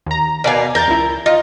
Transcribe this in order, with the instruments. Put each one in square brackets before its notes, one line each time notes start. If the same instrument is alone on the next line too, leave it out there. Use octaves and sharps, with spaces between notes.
[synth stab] D#2 A#5
[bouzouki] B2 F5 [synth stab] A#4 D5 G#5
[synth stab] E2 G6 A6 [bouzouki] A#4
[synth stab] C#2 E4
[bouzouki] D#4 [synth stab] F4